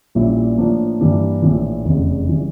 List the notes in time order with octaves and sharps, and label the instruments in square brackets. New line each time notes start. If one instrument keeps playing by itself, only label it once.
[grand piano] A#1 A#2 G3 C#4 E4
A2 F3 A#3 D4
G2 E3 G3 A#3
A#1 A2 E3
F1 E2 C#3
C#3 E3 G3